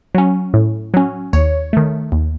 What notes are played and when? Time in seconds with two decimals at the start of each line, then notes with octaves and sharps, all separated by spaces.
0.15 F#3 C#4
0.54 A2
0.94 F#3 C#4
1.33 D#2 C#5
1.73 D#3 A3
2.12 D#2